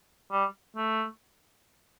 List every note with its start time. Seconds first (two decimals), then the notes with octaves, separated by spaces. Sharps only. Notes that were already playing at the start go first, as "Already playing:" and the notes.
0.31 G3
0.77 A3